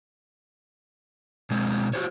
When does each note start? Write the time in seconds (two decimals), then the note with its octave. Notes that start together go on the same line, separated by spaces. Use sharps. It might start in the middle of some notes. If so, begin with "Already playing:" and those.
1.51 B2 G#3 C4
1.93 F#4 G4 C5 C#5